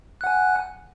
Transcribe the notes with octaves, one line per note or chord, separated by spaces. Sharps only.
F#5 G#5 F#6